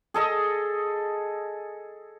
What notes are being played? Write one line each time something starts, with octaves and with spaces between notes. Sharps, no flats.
G#4 A4 D#5